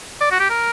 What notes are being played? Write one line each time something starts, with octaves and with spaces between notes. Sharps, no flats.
D5
F#4
G4
A#4